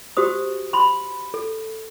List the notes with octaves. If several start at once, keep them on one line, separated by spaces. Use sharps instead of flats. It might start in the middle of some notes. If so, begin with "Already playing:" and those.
F#4 G4 C5 D#6
B5 C6
A4